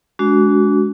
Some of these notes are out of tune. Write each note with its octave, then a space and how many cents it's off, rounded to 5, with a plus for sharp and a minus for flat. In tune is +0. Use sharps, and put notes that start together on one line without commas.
G#3 +20 D4 -35 F#4 +0